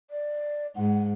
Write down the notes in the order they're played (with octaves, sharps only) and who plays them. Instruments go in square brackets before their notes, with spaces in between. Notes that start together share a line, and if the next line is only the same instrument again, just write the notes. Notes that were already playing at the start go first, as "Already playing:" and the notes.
[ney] D5
[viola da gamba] G#2 [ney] F#5